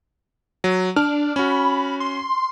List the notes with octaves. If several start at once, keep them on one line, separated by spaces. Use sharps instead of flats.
F#3
D4 F6
C#4 F#4 B5
C6